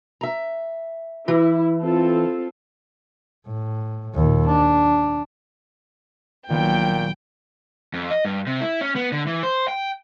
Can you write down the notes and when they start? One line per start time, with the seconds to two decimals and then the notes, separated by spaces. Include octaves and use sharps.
0.21 E5 A#5
1.28 E3 E4
1.82 C4 F4 A4
3.47 A2
4.15 D#2 A#2
4.47 D4
6.50 A#1 A#2 D#3 F#3 B3 G5
7.94 F2
8.11 D#5
8.25 G2
8.47 C3
8.61 E4
8.81 C#4
8.96 B3
9.12 D3
9.27 E3
9.43 C5
9.68 G5